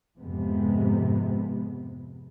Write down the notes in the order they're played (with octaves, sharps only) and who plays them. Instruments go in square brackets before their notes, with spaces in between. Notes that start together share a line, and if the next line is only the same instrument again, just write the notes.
[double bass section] F2 G#2 C3 G#3 B3